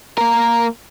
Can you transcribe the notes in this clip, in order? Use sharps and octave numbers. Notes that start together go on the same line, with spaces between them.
A#3 A#4